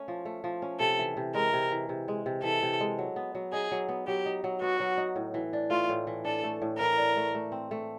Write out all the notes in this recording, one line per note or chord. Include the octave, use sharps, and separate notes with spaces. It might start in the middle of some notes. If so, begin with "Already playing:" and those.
Already playing: A3 C#4
F3
A3
F3
C#4
C3 A4
E3
C3
G#3 A#4
C3
E3
C3
G#3
C3
E3 A4
C3
G#3
F#3
B3
F#3
D#4 G#4
F#3
B3
F#3 G4
D#4
F#3
B3 F#4
F#3
D#4
A2
E3
D4
A3 F4
A2
E3
D4 A4
A3
A2
E3 A#4
D4
A3
A3
C4
A3